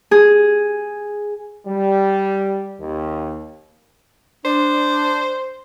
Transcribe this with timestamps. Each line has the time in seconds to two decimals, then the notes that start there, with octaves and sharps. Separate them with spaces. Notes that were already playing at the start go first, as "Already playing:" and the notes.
0.11 G#4
1.66 G3
2.80 D#2
4.45 D4 C5